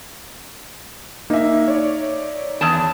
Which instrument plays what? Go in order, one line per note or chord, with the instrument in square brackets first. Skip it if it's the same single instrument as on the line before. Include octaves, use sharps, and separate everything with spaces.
[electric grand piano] A#3 [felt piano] D#4 E5
[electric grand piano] C#5 D5
[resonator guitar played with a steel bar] E2 A5